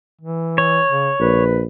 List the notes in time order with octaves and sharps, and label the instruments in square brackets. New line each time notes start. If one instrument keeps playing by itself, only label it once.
[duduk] E3
[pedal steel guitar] C#5
[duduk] C#3
[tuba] A#1 [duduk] B4